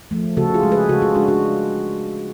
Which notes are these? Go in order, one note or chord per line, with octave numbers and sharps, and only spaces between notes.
F3 A3
C#3 F#4 A4
F4 G#4
G#3
G#4 B4
C#3 F#4 A4
F4 G#4
G#3 D4 F#4
D4 F#4